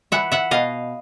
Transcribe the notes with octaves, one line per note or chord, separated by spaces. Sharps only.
E3 E5 F#5
E5 F#5
B2 D#5 F5